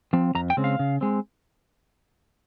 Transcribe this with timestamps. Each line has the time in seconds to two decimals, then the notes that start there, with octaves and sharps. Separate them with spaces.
0.13 F3 C4
0.35 F2 A#5
0.50 G5
0.57 C#3 G#3 C4
0.64 F5
0.79 C#3
1.01 G#3 C4